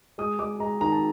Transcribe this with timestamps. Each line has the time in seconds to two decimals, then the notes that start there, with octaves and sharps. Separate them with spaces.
0.18 G#3 D#6
0.39 G#3 D6
0.60 G#3 A#5
0.81 D#3 A#5
0.92 A5